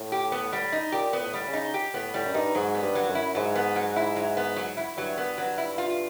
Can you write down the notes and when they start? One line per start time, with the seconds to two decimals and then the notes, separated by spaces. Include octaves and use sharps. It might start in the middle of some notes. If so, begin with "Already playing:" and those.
Already playing: A2
0.12 G4
0.32 B3
0.53 G3
0.72 D#4
0.92 A#2 G4
1.13 B3
1.20 A2
1.34 G3
1.47 C#3
1.53 D#4
1.74 G4
1.94 A2 B3
2.14 A2 G3
2.25 F#2
2.34 G2 D#4
2.55 G#2 F#3
2.74 B3
2.82 G2
2.95 F#3
3.09 F#2
3.15 E4
3.35 G#2 F#3
3.55 B3
3.76 F#3
3.96 E4
4.16 F#3
4.37 B3
4.56 F#3
4.77 E4
4.97 G2 F#3
5.18 B3
5.38 F#3
5.58 E4
5.78 F4